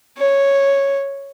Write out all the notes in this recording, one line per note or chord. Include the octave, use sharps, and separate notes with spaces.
C#5